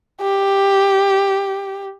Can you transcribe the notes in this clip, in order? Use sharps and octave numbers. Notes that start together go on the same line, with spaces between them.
G4